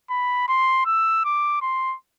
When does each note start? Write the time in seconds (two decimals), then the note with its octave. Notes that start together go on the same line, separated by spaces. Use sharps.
0.10 B5
0.48 C6
0.86 E6
1.25 D6
1.61 C6